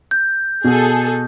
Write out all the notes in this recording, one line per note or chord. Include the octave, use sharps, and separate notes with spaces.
G6
B2 G#4 A4